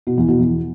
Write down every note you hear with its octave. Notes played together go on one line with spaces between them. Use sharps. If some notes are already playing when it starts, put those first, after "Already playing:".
B2
E2
B2
E2